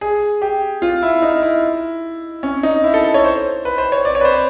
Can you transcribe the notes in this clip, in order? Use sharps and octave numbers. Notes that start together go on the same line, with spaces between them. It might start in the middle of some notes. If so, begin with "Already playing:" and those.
G#4
G4
F4
E4
D#4
E4
C#4
D#4
E4
A4
A4
C#5
C5
B4
C5
C#5
D5
C#5
B4
C5